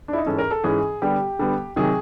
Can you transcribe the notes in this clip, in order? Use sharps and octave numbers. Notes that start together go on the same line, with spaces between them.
D4
E4
D#4
G#2 E3 G#3 C#4 A4
A#4
A4
G#2 E3 G#3 C#4 G#4
D3 G3 B3 G4
D3 G3 B3
C3 D#3 F#3 G#4